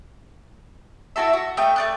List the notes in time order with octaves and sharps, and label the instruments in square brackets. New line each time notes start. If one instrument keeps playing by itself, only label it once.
[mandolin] E4 F#4 A4 E5
F#4
A3 D#5 G5
A3 D5 F#6